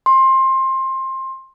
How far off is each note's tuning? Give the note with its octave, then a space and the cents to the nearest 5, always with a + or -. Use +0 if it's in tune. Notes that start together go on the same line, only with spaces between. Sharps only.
C6 +20